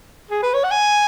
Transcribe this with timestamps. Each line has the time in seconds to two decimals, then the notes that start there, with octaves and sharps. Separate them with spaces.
0.31 G#4
0.43 B4
0.54 C#5
0.64 F#5
0.71 G#5